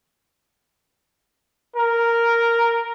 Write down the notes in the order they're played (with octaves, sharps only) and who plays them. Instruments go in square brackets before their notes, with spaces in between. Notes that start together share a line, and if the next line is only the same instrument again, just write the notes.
[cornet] A#4